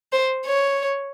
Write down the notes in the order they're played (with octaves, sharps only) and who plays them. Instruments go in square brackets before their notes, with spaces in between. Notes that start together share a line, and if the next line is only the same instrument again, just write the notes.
[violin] C5
C#5